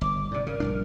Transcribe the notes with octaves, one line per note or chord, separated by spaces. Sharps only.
G1 D6
G#2 C3 D5
C#3 A#4
A#1 G2 D4